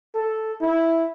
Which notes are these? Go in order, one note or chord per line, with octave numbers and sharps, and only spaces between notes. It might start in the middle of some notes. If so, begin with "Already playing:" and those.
A4
E4